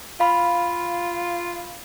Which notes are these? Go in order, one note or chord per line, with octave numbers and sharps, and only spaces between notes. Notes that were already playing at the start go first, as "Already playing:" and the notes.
F4 F5 B5